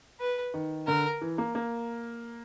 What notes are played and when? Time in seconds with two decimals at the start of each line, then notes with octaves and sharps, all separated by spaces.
0.20 B4
0.54 D#3
0.87 D3 A#4
1.21 E3
1.38 A#3
1.55 A#3